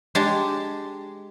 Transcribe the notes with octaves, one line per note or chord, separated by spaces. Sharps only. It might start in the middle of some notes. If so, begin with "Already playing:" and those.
G#3 D4 G4 D5